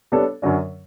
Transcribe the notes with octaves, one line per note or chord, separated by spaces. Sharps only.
G3 B3 D4 A4 C#5
F#2 D3 F#3 C#4